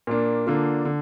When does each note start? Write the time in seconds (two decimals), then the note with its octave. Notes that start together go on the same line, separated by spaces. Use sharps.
0.07 A#2 A#3 D4
0.47 D3 A#3 D4 F4
0.85 D3